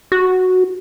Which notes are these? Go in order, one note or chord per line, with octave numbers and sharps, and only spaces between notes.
F#4